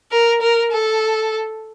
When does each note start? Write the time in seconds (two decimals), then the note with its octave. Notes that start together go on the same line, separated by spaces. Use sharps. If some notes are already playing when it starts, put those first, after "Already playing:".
0.11 A#4
0.42 A#4
0.71 A4